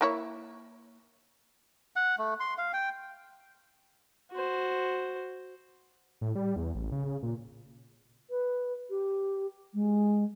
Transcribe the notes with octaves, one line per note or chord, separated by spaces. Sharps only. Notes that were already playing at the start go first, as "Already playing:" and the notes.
A#3 E4 C#5
F#5
A3
C6
F5
G5
F#4 C5
A2
G3
E2
A1
C#3
C#3
A#2
B4
G4
G#3